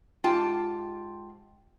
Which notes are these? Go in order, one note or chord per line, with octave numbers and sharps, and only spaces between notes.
G#2 F4 G4 G5 A5